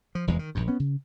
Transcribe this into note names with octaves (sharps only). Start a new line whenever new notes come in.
F3
F1 E2 E3 G#3
D#3
A#1 G2
B3 C#4
C#3